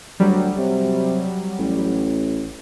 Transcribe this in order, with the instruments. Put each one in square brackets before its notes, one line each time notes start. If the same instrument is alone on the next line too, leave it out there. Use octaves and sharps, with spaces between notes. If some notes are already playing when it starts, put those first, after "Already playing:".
[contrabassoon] D2 [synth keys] F#3 G3
[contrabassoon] C3
A1